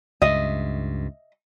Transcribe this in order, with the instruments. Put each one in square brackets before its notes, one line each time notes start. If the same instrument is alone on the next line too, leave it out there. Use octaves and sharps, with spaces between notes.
[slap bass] C#2 G2 [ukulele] D#5 E5